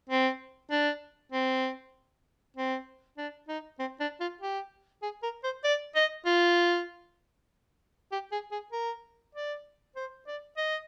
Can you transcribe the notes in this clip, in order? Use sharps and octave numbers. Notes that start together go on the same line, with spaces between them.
C4
D4
C4
C4
D4
D#4
C4
D4
F4
G4
G#4
A#4
C5
D5
D#5
F4
G4
G#4
G#4
A#4
D5
C5
D5
D#5